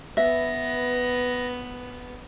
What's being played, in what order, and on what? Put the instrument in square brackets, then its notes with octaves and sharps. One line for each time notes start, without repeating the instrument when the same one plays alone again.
[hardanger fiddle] B3 [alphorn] B4 [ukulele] E5 [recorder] A#6